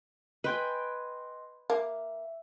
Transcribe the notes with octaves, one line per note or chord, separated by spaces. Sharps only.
B4 D#5 G5 G#5 C6
A#3 E5